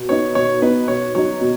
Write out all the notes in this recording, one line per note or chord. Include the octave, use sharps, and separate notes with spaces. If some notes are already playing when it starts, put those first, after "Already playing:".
Already playing: B2
B3 D#4 C#5
B2 C#5
B3 D#4 B4
B2 C#5
F#3 D#4 C#5
B2